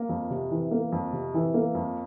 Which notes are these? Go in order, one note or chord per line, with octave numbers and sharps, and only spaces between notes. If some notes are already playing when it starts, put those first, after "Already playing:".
Already playing: A#3
F2
C3
E3
A#3
F2
C3
E3
A#3
F2